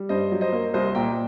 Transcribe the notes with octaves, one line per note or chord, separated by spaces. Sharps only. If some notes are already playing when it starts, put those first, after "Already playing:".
Already playing: G3
G2 C5 D#5
F#3
C5 D#5
A#3
C2 C5 D#5
A#2 G5 A#5